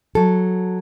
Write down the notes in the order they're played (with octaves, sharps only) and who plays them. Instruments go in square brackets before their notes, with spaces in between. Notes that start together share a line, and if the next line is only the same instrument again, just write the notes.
[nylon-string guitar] F#3 A4